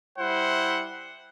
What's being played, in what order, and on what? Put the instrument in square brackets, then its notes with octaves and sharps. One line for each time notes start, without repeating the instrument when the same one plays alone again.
[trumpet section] G3 E4 C5 F#5